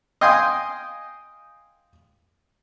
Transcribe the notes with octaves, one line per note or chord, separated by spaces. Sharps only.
D#5 F5 G5 G#5 C6 D#6